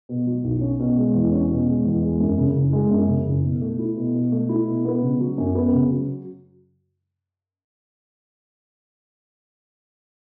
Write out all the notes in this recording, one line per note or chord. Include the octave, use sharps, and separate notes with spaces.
B2
F#3
B1
C#4
B2
G#3
E2
C#4
B2
G#3
E2
G#3
F#2
C#3
F#1
G#3
F#2
C#3
F#1
B2
A3
E4
B2
B2
A3
E4
B2
B3
C#3
F#3
F#2
B3
C#3
F#3